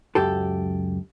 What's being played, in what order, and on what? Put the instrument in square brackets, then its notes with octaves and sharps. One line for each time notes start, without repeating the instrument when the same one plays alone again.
[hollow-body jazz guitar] C#2 F#2 G4 A4